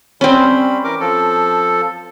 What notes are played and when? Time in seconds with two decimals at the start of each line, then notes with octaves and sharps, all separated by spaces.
0.21 G3 C4 C#4 B5
0.84 E3 A#4 D6
1.00 F3 A4